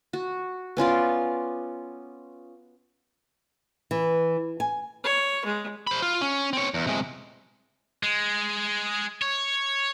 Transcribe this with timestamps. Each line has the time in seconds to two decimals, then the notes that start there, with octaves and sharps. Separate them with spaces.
0.13 F#4
0.77 B3 C#4 F4 D5
3.91 E3
4.60 G#5
5.04 C#5
5.45 G#3
5.87 C5 B5
6.02 F4
6.21 C#4
6.53 C4 C#5
6.74 E2
6.87 C3 G#3
8.03 G#3
9.22 C#5